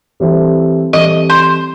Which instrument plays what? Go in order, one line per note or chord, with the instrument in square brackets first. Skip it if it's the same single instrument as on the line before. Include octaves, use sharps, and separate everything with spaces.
[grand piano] E3 G3 C4 E4 A4
[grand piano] E3 G3 C4 E4 A4 [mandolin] D#5
[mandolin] C5